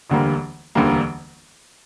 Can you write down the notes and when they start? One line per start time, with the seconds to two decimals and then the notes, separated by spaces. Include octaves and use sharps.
0.10 E1 D2 D3 G3 A#3
0.75 E1 D2 D3 G3 A#3